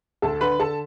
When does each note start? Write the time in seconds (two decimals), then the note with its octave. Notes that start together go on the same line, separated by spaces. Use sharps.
0.22 D2 A4 A5
0.41 D3 B4 B5
0.59 D3 A4 A5